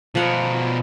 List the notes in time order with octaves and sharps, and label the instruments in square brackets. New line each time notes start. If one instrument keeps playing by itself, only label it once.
[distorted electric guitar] B2 A#4 [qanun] F3 F#5